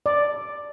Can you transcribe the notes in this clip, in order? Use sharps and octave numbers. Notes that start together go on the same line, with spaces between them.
D5